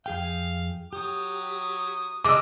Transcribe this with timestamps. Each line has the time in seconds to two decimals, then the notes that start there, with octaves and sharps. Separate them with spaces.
0.06 F2 G#4 F5 G5
0.93 F#3 G4 D#6
2.24 G3 G#3 D6 E6